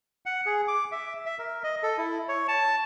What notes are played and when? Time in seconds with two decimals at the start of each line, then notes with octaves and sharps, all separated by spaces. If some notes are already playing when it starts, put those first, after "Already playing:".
0.26 F#5
0.46 G#4
0.68 D6
0.92 E5
1.26 E5
1.39 A#4
1.64 D#5
1.83 A4
1.98 E4
2.29 C#5
2.48 A5